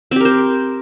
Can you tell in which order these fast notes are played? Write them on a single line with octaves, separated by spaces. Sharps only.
C4 G4 A#4 C5